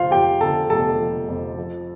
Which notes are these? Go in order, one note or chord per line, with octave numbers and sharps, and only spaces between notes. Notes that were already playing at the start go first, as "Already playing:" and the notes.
Already playing: F1 D3 F3 F4 C5 F5
F2 G4 G5
D3 A4 A5
F1 A4 A5
F3
F2
F3